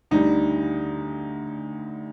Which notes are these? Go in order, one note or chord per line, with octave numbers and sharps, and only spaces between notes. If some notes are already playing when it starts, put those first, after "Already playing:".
D2 D3 G3 D#4